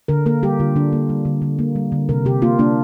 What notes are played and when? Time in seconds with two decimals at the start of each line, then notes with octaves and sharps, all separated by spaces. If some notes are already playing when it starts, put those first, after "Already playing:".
0.08 D3 A#4
0.26 A#3 A#4
0.43 G3 G4
0.60 D3 F4
0.76 D3 D4
0.93 A#3
1.09 G3
1.25 D3
1.42 D3
1.59 A#3
1.76 G3
1.92 D3
2.09 C3 A#4
2.25 C3 G4
2.42 A#3 F4
2.59 A#3 D4